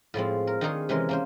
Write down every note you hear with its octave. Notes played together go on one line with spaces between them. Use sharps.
A2 F3 G#3 C4
A#4
D#3 C4 D4 D#4 G#4 C#5
C3 E3 G#3 C#4 A#4 C6
A#3 C#4 C5